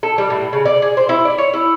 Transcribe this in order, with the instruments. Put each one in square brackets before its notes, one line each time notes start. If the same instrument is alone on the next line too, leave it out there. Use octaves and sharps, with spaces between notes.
[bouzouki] A4
G3
A2
C#3
D5
G#4
C5
E4
D5
C#5
E4